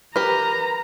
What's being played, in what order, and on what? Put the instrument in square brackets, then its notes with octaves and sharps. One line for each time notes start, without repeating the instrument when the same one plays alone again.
[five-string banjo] G4 A#4 [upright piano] B4 [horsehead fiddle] A#5